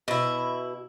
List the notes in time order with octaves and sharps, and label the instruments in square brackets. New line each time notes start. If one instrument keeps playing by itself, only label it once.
[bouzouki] B2 E4